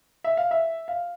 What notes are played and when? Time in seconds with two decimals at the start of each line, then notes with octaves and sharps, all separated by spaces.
0.24 E5
0.37 F5
0.51 E5
0.88 F5